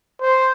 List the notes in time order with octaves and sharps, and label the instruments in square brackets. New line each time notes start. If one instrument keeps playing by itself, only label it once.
[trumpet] C5